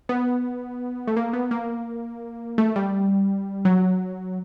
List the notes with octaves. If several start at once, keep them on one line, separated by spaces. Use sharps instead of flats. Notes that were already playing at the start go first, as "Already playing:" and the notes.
B3
A3
A#3
B3
A#3
A3
G3
F#3